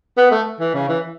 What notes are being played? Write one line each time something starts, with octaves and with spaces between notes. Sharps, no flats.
B3
A3
E3
C#3
E3